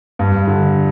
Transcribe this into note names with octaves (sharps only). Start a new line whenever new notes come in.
G2
D3